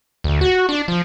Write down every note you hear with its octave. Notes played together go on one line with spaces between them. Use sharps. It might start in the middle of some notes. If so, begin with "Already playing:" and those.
D2
F#4
D4
F3